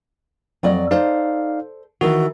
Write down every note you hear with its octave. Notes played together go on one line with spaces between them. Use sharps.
F2 F#3 D5 D#5
D#4 A4 C5 D5 F5
D#3 E3 F#4